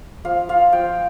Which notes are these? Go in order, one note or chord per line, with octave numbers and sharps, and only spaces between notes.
F3 F5
F4 F5
F3 G5